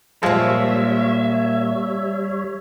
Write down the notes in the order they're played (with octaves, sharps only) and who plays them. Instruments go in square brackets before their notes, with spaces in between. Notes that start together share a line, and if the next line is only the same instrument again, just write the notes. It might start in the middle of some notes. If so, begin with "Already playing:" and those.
[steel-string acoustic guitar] A#2 A#3 [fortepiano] F3 G#3 [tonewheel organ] G3 C#5 [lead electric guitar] E5